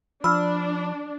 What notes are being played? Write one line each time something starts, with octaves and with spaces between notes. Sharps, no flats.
F3 D4 B5 E6 F6